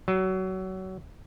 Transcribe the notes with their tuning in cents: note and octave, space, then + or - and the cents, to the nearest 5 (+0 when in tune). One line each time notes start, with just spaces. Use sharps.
F#3 +25